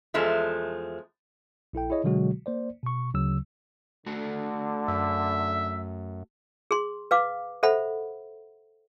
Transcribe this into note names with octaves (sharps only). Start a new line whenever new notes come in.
E2 F3 G#3 A3
A#1 E4 A4 G5
E4 G#4 C#5 D#5
B2 D3 F#3 G#3 F#4
A#3 C5 D5
B2 C#6
D2 C#3 F#3 E6
D3 A3 F#4 A4
F#2 E5
G#4 C6
B4 F5 D6
A4 C5 E5 F#5 B5